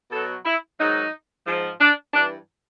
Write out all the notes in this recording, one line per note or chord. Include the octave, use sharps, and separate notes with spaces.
B2 F#3 A4
E4
G#2 D#3 F#3 D#4
G#2 F3
D4
G2 E3 D4